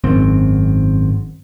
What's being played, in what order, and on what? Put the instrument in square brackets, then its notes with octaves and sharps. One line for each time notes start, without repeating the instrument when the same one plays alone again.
[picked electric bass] G#1 F#2 C4